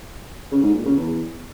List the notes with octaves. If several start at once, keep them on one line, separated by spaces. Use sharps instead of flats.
C#3
G#2
A#2
C#3
E2